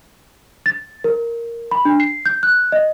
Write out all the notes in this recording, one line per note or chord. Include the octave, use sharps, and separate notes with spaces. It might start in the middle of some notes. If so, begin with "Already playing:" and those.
A6
A#4
B5
D4
C7
G6
F#6
D#5